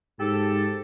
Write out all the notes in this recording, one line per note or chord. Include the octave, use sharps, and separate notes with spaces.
G#2 G4 A4